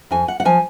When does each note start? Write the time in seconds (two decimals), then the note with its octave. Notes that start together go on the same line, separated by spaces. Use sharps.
0.11 F2 G#5
0.28 F#5
0.40 F#5
0.45 F3 G#5